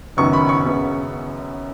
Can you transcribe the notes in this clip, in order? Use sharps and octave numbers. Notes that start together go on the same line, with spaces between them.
F#1 F#2 D#3 B3 C#6
B5
C#6
F#2 C#3 B3